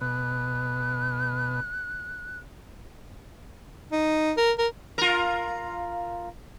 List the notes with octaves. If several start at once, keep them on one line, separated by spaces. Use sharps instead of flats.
B2 F#6
D#4
A#4
A#4
F4 A#4